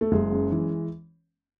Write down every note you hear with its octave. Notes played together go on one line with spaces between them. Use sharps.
A3
F#1 G#3
F#2
E3